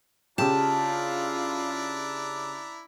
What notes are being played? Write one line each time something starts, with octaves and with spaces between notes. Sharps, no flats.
C#3 D4 E4 F4 G4 A5 A#5